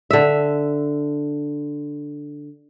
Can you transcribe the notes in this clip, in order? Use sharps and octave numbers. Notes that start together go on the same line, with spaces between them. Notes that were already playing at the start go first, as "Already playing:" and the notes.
D3 E5